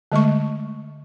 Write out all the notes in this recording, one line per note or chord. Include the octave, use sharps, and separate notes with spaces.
D3 G#3 A3 C#6